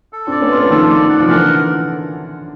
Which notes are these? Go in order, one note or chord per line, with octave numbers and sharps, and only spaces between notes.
A4
C4 D4 D5
B3 C#4
F4
A3 B3
D#3 F3 A4
D5
F#5
F3
D3 E3 A#4